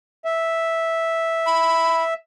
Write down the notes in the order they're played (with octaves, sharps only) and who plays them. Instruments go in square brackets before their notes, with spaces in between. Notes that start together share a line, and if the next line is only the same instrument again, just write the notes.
[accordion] E5
[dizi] B5